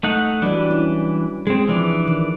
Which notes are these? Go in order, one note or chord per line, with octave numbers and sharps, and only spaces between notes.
A3 D#4 F#5
E3 F#3 G3 D4 D5
C#4 E4
G#3 C4 G#4
E3 F3 D4 D5
D#3